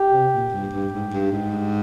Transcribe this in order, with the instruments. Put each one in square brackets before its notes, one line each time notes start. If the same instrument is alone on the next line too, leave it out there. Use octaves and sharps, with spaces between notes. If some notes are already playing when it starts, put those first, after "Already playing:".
Already playing: [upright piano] G4
[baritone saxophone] C3
A#2
G2
G2
G#2
G2
G#2